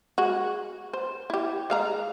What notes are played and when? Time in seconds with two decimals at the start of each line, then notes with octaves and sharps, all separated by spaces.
0.18 G#3 F#4
0.93 C5
1.30 E4 G4
1.70 G#3 F5 A#5